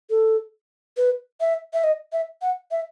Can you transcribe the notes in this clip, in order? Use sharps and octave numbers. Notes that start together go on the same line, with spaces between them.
A4
B4
E5
E5
D#5
E5
F#5
E5